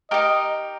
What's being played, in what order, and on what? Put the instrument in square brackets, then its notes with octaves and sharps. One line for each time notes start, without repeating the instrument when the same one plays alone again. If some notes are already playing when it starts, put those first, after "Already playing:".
[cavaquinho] D#4 G4 A#4 [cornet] D#5